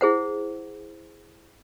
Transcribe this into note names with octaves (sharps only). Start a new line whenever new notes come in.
E4 G#4 C5 F#5